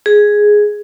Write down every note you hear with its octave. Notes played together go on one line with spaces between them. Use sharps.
G#4